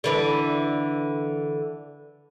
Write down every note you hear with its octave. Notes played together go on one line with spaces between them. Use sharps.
D3 E3 D4